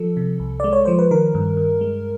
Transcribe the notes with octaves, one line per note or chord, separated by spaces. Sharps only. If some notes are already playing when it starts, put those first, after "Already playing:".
Already playing: F3 A4
C3
C2
G#3 D5
C#5
F3 C5
B4
D#3 A#4
G2
G2
G#3